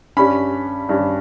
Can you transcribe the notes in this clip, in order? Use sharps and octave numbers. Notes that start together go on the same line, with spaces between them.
G2 G3 C#4 B5
G2 G3 C#4